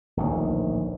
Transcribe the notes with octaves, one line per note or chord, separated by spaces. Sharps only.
D1 A#1 D#3